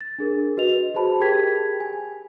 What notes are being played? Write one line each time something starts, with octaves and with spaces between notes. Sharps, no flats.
A6
D4 G#4 A#4
F#4 B4 D#5 F7
F#4 G#4 C5 A5 B5
G4 G#4 A#4 G5 G#6 B6
G#5